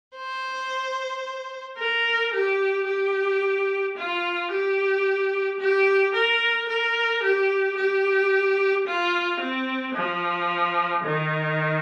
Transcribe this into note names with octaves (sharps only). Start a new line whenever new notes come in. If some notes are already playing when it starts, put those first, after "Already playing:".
C5
A#4
G4
G4
F4
G4
G4
A#4
A#4
G4
G4
F4
C4
F3
D#3